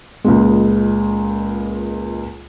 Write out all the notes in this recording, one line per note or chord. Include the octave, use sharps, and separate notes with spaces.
C#2 A#2 G#3